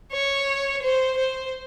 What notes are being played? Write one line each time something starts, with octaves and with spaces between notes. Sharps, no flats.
C#5
C5
C5